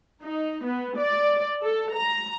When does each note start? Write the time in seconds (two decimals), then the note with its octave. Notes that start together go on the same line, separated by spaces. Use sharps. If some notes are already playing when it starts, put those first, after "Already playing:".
0.23 D#4
0.65 B3
0.99 D5
1.63 A4
1.94 A#5